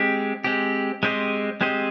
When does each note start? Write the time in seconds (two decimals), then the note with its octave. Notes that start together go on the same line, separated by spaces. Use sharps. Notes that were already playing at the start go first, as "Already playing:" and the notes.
Already playing: G#3 C4 G4
0.44 G#3 C4 G4
1.03 G#3 C4 G4 C5 D#5
1.61 G#3 C4 G4 C5 D#5